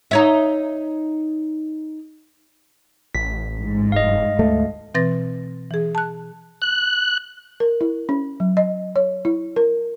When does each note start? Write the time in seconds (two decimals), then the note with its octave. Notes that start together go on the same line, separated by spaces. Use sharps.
0.11 D#4 C#5 E5
3.15 A1 B6
3.59 G#2
3.92 F1 D#5 F5
4.39 D2 A3
4.94 B2 E3 C4 B4 A6 A#6
5.71 E3 G#4
5.95 A5 F#6
6.62 F#6
7.60 A#4
7.81 E4
8.09 C#4
8.40 F#3
8.57 D#5
8.96 C#5
9.25 E4
9.56 A#4